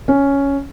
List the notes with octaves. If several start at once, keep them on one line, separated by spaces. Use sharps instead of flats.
C#4